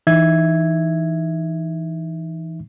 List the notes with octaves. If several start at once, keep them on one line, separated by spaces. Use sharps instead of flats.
E3 D#4 E5 G#6